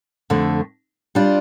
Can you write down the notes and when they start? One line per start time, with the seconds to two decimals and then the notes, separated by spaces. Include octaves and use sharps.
0.30 F2 D3 A3
1.15 G3 D4 F4